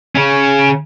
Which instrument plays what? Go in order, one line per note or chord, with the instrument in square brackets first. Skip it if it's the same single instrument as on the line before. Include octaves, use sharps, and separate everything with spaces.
[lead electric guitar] C#3 C#4